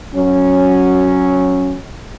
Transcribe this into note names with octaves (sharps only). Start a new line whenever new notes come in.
F#3 C#4